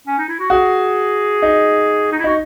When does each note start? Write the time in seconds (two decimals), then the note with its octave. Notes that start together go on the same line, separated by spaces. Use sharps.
0.07 C#4
0.18 D#4
0.28 E4
0.39 F#4
0.50 F#4 G#4
1.42 D#4
2.12 D#4
2.19 E4
2.24 D#4 F#4